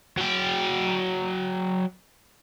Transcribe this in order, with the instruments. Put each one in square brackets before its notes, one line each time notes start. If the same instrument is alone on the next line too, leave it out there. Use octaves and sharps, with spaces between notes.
[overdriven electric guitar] F#3 G5